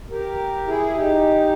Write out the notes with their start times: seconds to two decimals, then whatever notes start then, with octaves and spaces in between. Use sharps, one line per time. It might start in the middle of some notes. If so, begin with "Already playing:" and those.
0.10 G4 A#4
0.67 E4 G#4
0.95 D#4 G4